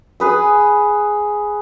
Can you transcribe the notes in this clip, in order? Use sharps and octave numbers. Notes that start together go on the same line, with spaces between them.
G#4 B4 D#6